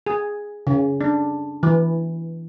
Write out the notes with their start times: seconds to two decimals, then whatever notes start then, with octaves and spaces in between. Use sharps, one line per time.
0.07 G#4
0.67 C#3
1.01 D4
1.63 E3